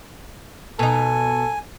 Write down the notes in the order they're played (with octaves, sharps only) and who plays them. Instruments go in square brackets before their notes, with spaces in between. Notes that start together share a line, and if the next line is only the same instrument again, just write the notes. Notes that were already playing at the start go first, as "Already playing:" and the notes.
[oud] B2 D#4 [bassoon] A4 [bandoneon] G#5